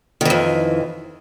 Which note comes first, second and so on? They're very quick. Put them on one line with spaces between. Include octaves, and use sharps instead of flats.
D#3 E3 F2